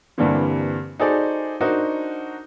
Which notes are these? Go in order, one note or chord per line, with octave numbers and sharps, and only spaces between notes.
G2 D3 E3 G3 A#3 C4
D#4 F#4 G#4 A4 C5 D5
D4 D#4 F#4 A#4 C5